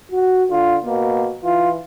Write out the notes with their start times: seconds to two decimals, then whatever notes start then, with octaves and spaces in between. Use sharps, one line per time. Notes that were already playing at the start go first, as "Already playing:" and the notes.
0.11 F#4
0.51 D3 F4
0.84 B2 A#3
1.44 E3 F4